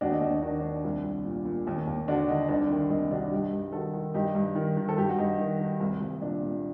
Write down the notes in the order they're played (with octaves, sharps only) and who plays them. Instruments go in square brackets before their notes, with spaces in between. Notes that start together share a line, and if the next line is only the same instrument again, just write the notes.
[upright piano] D#2 D4 F#4
D#4
D#2 D4
D#3 D4
D#3 D4
C2
C2
A#2
A#2
D#2
D#2
D3 D4 F#4
D3 D#4
C2 D4
D#3
C2 D#4
C3 D4 F#4
G2 D#4 G4
G2
D#3 F#4 A4
D#3
G2 D#4 G4
G2
D#3
D#3
A4
G2 G4
F#4
G2 D#4
D#3
D#3
C2
C2
A#2 D4
A#2